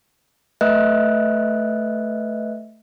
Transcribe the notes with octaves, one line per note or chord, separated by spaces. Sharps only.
A3 B4 D#5 E5 F#6